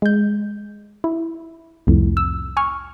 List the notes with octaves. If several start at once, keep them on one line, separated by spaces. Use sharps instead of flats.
G#3 G6
E4
C2 F2 A2
E6
G#5 C#6 F6